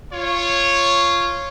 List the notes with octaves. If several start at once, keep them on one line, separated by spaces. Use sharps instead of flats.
F4 C#5